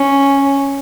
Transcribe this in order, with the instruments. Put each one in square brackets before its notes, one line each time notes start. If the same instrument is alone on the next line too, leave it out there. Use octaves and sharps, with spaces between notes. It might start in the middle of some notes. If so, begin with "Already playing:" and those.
Already playing: [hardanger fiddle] C#4